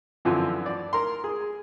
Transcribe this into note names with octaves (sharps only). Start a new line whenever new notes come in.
F#2 D3 E3 F3 C4
D5
A#4 C6
G#4